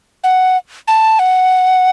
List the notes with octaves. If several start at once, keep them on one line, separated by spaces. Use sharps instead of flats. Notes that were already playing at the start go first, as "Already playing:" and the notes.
F#5
A5
F#5